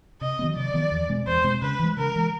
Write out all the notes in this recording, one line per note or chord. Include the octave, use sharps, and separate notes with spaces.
C3 D#5
D#3 F#3 B3
C3 D5
D#3 F#3 B3
E2
B2 G#3 C4
E2 C5
B2 G#3 C4
C#3 B4
E3 G#3
C#3 A#4
E3 G#3